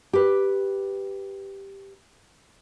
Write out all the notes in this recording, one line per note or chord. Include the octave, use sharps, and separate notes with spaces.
G4 B4